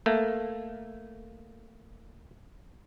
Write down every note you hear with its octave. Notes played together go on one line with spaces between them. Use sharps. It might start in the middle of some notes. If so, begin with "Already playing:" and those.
A3 A#3